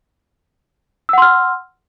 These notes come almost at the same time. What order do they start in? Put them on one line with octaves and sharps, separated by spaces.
E6 F#5 C6 F6